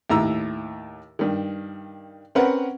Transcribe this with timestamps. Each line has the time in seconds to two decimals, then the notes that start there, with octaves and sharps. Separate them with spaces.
0.10 D#2 A2 A#5 E6
1.19 G2 D#3
2.35 C4 C#4 A#4 B4 F#5